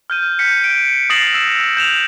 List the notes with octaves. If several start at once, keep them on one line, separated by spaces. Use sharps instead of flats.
F6 G6 D#7
F#6 G6 B6 C#7
D7
D#6 A6 A#6 C7 E7 F#7
E6 E7
G6 E7 F7